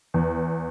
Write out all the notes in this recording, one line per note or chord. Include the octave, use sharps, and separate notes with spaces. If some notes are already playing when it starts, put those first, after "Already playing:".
E2